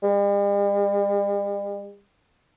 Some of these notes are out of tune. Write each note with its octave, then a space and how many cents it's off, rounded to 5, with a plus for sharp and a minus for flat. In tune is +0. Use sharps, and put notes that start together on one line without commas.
G3 +45